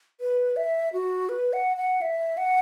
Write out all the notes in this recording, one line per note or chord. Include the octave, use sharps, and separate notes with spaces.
B4
E5
F#4
B4
F#5
F#5
E5
F#5